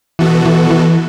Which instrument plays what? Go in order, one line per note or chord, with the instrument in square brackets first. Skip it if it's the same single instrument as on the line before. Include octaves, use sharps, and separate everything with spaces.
[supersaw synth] B2 B3 F#4 A4 [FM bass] E3
[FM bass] E3
E3